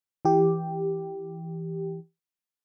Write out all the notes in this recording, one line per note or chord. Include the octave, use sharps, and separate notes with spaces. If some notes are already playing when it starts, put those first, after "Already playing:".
E3 G4